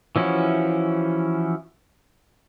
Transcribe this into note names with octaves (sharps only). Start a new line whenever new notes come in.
E3 F3 C#4 E4 F#4